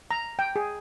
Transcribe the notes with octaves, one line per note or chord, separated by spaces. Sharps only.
A#5
G5
G#4